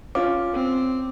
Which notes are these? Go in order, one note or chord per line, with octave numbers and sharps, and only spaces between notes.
C#4 F4 D6
C4